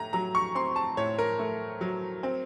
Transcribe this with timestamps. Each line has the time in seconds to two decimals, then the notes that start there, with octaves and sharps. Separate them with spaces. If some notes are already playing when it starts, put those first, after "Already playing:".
Already playing: A2 A3 A#5
0.13 F#3 A#5
0.35 C#6
0.55 C4 C6
0.76 A5
0.97 A2 C#5
1.19 A#4
1.39 A3
1.81 F#3
2.23 C4